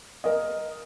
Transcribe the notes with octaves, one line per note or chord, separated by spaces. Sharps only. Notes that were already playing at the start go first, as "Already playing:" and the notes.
A#4 D#5